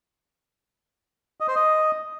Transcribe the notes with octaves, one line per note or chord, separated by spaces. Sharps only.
D#5
C5
D#5